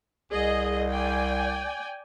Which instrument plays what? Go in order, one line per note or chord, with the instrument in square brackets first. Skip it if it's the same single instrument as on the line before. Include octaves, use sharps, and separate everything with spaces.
[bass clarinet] C2 [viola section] G#4 D#5
[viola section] D5 G5 G#5